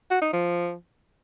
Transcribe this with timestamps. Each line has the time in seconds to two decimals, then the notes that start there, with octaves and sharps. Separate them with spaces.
0.10 F#4
0.22 D#4
0.33 F3